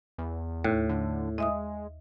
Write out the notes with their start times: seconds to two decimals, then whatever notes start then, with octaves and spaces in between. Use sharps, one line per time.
0.18 E2
0.64 D#2 A2
0.89 D3
1.38 G#3 D#5 E5 D#6